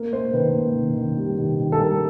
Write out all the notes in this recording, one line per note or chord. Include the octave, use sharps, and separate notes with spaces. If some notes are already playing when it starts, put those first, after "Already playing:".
Already playing: A#3 A#4
A#3 C5
D#3 B4
A#3
D#3
D#3
G3
D#3
D#3
A4
G3 A#4